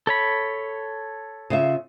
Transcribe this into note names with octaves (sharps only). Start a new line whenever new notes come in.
A4 C#5 B5
C#3 F4 E5